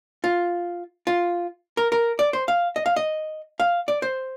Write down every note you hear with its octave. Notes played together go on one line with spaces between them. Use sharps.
F4
F4
A#4
A#4
D5
C5
F5
D#5
F5
D#5
F5
D5
C5